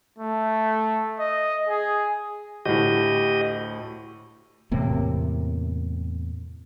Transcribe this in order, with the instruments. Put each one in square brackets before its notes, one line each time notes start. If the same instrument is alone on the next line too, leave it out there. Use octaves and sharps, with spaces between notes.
[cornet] A3
D#5
G#4
[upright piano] D2 A2 [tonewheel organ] G4 D#5
[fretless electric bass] E2 A2 C3 A#3